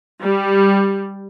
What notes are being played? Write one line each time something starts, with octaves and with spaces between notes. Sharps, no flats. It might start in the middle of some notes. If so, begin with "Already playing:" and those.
G3